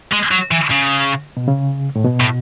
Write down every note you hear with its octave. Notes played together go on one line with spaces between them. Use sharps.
G#3
F#3
E3
C#3
B2
C#3
A2
B2
A2